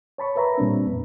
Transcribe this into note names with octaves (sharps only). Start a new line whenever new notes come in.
C#5 A5 B5 C#6
A#4 B4 E5 A#5 B5
A#2 G3 C4 D4
F2 B3